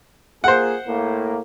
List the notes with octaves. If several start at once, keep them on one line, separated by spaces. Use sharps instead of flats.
A#3 F4 G#4 C5 F#5
A2 A#3